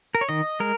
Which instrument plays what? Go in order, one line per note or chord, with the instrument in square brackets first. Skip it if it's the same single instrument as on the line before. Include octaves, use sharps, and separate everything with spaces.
[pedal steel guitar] A#4
C#5
D#3 D#5
G#3 A#4